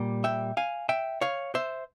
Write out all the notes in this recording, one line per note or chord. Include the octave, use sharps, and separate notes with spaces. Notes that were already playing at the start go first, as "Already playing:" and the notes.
Already playing: A#2 G3 A#3
E5 G5
F5 G#5
E5 G5
C#5 F5
C5 E5